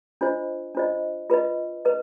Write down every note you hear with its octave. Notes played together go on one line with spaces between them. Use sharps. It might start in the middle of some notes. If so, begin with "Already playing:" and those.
D4 F4 C5 D#5
D4 F4 C5 D#5
F4 B4 D#5
B4 D#5